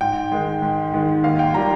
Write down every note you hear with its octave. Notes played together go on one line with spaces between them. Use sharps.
G#2 G5
D#3 G#3
G#2
D#3 G#3
D#2 F5
G5
D#3 G3 A#5